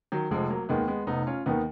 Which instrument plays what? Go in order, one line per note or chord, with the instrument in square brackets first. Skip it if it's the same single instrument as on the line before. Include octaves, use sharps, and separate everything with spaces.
[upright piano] D#3 F#3
[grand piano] F1 [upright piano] F3 G#3
[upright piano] F#3 A#3
[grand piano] D#2 D#3 [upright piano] G#3 B3
[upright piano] G#3 B3
[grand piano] F1 [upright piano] B3 D#4
[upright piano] C#4 F4
[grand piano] D#2 D#3 [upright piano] B3 D#4